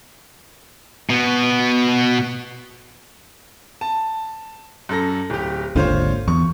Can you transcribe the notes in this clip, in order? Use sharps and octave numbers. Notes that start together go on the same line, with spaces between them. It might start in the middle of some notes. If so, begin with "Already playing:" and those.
B2 B3
A5
F#2 A4 A#6
D1 G4
G#1 D#2 D3 F4 C5 C#5
E2 C#6